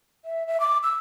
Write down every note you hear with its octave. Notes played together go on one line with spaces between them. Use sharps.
E5
E5
D6
E6